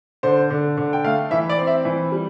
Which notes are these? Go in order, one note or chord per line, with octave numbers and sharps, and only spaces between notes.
D3 C5
D3
D3
G5
A3 F5
E3 E5
D5
C4
E5
E3
G3